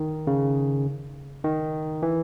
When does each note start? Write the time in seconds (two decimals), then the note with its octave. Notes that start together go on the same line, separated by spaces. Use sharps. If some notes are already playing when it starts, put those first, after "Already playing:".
Already playing: D#3
0.27 C#3
1.44 D#3
2.03 E3